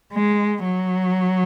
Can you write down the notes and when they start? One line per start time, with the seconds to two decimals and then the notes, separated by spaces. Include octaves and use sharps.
0.13 G#3
0.64 F#3